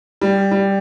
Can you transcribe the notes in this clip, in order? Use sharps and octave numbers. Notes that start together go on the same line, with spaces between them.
G3
G3